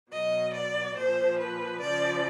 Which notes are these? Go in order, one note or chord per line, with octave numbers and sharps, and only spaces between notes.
B2 F#3 D#5
D5
A#2 F3 C5
B4
C#3 F3 D5